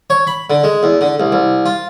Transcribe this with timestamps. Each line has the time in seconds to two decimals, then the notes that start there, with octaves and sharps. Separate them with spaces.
0.10 C#5
0.27 B5
0.50 D3
0.64 G#3
0.83 E2
1.01 D3
1.20 C2
1.32 C2
1.66 F4